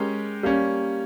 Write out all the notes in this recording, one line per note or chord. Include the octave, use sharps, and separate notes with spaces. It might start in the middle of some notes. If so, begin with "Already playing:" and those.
Already playing: G#3 C#4 G4 A#4
G3 A#3 C#4